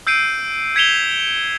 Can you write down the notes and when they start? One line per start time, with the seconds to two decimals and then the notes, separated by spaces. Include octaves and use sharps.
0.07 E6 G6 C7 D7 D#7
0.76 G#6 B6 C#7 E7 F7 G7